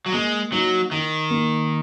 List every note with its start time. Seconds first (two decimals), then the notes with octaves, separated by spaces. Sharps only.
0.06 F#3
0.12 G#3 A#3
0.52 F#3 D#4
0.91 D#3 D#4
1.30 A#3